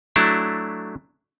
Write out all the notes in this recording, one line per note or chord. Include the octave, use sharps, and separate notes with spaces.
F#3 A3 D4 E4